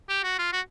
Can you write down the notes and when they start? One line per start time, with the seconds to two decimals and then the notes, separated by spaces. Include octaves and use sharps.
0.09 G4
0.24 F#4
0.39 F4
0.53 F#4